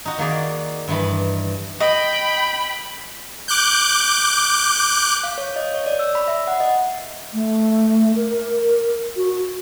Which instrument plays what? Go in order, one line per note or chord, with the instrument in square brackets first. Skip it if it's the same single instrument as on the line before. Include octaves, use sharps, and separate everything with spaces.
[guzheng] D#4 F#4
D#3 A#3 G#4 D5
G2 D#3 E3 B5
[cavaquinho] D#5 [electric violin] G5 B5
[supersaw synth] D6 F#6 G6
[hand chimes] F5
C#5
D#5
C#5
D5
E6
B5
E5
F#5
D#5
[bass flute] A3
A#4
F#4